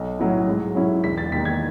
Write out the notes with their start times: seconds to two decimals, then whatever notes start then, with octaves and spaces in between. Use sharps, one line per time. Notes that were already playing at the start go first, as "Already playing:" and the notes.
Already playing: B1
0.19 A2 F#3 C#4 E4
0.48 G#2
0.75 F#3 C#4 E4
1.04 E1 B6
1.18 A6
1.32 D#2 D#3 B6
1.45 G#6